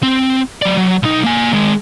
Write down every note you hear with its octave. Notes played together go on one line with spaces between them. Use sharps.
C4
F#3 D5
F#3
B1 D#4
A#3 G#5
D#3 G#3